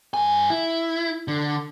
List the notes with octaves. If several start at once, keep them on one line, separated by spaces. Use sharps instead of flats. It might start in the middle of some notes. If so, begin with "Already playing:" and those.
G2 G#5
E4
D3